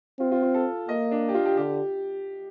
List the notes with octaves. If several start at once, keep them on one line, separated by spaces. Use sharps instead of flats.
C4 F4
F4
F4
A4
A#3 D#5
D4
G4
F4
G4
D3 G4